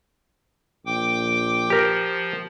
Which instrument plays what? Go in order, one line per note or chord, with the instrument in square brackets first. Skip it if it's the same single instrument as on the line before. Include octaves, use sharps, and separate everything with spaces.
[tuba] A#1 [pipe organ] G5 D6
[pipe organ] F3 [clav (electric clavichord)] G4 A#4